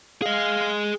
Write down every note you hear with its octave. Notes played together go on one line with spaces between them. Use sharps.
G#4 D#5 F5